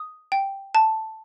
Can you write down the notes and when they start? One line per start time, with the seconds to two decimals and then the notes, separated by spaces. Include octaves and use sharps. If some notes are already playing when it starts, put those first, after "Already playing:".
Already playing: D#6
0.32 G5
0.75 A5